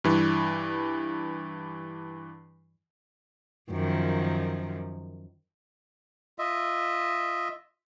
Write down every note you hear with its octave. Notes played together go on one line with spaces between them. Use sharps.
G2 E3
F#2 D#3 F3
F4 D#5 E5